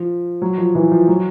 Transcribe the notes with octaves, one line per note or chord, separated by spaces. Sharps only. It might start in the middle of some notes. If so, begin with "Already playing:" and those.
Already playing: F3
F#3
F3
E3
F3
F#3